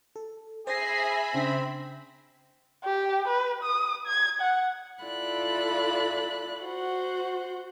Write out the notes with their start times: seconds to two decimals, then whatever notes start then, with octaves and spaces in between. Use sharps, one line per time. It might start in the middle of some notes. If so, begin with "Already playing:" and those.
0.16 A4
0.67 G#4 C5 E5 G#5 B5 A#6 C7
1.34 C#3 C4 D4 A#6
2.84 G4
3.28 B4
3.63 D#6
4.07 G#6
4.41 F#5
5.03 E4 F4 A4 D5 B5 F#6
6.63 F#4 C5 F#5